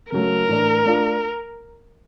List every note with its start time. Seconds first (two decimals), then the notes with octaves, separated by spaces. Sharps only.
0.12 C#3 F#3 A3 A#4
0.48 A2 E3 A3 D4
0.84 A3 D4 F4